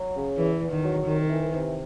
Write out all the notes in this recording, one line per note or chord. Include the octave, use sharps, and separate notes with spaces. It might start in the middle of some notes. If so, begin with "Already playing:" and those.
Already playing: F#3
C#3
E2 E3
E2
D#3
F#3
C2 D#3
E3
C3